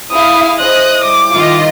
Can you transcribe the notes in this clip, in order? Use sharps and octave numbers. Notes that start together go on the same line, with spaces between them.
E4 G#4 F5 D#6
E4 G#4 C5 D#5 D#6 F#6
G3 D6
D#3 D#4 F4 D#5